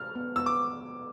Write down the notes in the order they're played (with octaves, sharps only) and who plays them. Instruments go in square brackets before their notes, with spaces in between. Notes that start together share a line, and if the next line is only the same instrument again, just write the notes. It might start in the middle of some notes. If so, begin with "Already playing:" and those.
Already playing: [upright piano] F6
[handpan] B3
[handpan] B3 [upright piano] E6
[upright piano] D6